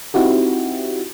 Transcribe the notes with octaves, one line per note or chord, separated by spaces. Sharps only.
C4 D#4 E4 F#4 G4